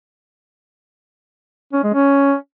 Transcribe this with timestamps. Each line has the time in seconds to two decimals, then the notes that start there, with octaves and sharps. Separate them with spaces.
1.73 C#4
1.83 G#3
1.94 C#4